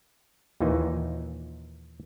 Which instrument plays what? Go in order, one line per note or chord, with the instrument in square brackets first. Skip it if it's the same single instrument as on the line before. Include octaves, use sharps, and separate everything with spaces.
[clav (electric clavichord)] D#2 A#2 E3 D#4